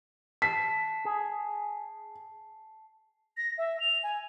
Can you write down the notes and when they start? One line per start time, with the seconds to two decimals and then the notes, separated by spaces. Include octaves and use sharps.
0.42 A5 B6 C7
1.05 G#4
3.37 A#6
3.58 E5
3.80 F7
4.03 G#5